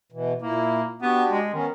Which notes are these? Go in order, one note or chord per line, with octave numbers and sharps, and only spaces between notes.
B2 E3
A#2 A#3 E4
B3 D4 F#4 G4
G#3
D#3 B3 C#4